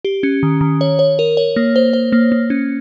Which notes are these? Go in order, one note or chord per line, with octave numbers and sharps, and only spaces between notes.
G4
C#4
D#3
D#3
C#5
C#5
A#4
C#5
A#3
C5
C5
A#3
A#3
C#4